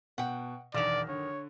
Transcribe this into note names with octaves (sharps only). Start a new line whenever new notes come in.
B2 F#5 G5
E1 F#2 D#3 D5 E7 F7
D3 C#5